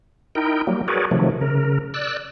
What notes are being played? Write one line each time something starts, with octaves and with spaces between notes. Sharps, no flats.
D#4 E4 A#4 G5
F#3 G3 A#3
F#4 G#4 A#4 B4 C#5 D5
C3 D#3 F3 F#3 A3
C#3 A#4
D5 E6 F#6